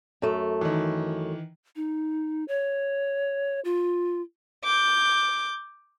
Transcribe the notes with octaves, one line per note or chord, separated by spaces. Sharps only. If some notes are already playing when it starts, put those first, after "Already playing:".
F#2 A3
D#3 E3
D#4
C#5
F4
D6 G6